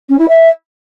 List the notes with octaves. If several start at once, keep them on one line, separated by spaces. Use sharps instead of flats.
C#4
E4
E5